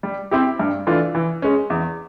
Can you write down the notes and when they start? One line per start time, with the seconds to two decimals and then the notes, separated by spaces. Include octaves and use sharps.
0.03 G3
0.31 C4 E4 G4
0.59 G2
0.87 E3 A3 D4 F4
1.15 E3
1.42 G#3 C#4
1.70 E2